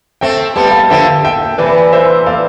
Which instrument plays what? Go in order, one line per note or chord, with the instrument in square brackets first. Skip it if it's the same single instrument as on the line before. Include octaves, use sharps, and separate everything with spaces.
[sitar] A3 C4 [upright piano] E5 G5
[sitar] G3 B3 [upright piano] A5
[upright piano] G5
F5 A5
[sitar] D3 F3 [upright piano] E5 G5
[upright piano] E5 G5
[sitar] C3 E3 [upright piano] B4 D5
[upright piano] C5 E5
D5 F5